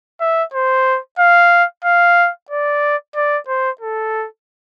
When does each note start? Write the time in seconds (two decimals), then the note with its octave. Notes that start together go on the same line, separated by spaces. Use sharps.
0.21 E5
0.54 C5
1.19 F5
1.84 F5
2.50 D5
3.15 D5
3.48 C5
3.81 A4